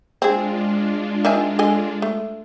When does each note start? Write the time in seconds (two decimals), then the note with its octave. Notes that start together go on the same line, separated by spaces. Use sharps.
0.22 G#3 C4 D4 F4 G#4
1.25 D#3 E5 G#5
1.59 A4 D#5 G#5
2.02 A3